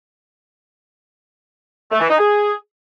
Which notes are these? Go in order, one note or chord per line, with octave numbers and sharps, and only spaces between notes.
A3
E3
D#4
G#4